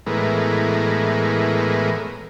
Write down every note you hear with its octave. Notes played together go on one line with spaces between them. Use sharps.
A2 E3 G#3 B3 A#4